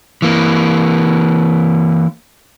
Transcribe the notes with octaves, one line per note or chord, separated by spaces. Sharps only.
E3 A#3